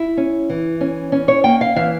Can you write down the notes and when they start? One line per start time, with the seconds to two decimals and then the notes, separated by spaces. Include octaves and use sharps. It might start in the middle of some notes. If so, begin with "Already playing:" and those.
Already playing: E4
0.17 C#4
0.49 E3
0.81 C#4
1.12 C#4
1.28 C#5
1.44 A#3 G5
1.61 F5
1.76 E3 F5